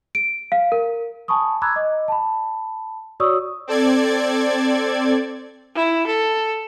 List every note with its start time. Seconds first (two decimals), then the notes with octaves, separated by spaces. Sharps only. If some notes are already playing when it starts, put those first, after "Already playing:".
0.15 D7
0.52 F5
0.72 A#4
1.28 G#5 A5 B5 C#6 D#6
1.62 A#5 B5 D6 E6 F#6 G#6
1.76 D#5 D6
2.08 A5 B5
3.20 F#4 C#5 D5 C#6 D#6 E6
3.67 C4 A4 D5 G#6
5.76 E4
6.07 A4